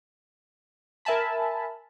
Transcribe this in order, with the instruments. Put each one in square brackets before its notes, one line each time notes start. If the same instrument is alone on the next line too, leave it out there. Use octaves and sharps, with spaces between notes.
[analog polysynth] A#4 E5 G#5 A5 B5